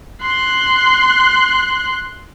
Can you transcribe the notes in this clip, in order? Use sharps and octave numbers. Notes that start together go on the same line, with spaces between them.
C6 F#6